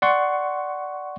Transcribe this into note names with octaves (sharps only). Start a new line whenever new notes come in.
D5 F#5 C6 C#6